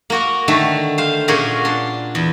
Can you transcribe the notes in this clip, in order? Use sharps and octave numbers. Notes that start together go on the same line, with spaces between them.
A#3 F#4 A#4
D3 D#3 A3
C5 F5
A#2 A#3 C#4 F#4 G#4
D4 C6
E2